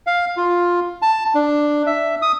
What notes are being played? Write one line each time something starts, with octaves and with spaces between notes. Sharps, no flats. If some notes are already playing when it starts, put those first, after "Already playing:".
F5
F4
A5
D4
E5
D#6